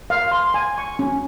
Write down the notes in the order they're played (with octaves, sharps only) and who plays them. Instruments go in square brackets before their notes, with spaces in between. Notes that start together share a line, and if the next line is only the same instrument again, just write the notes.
[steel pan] F5
C6
G#5
C#6
C#4